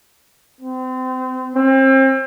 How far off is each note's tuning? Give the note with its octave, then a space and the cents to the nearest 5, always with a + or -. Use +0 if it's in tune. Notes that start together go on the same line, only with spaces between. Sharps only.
C4 -30
C4 +35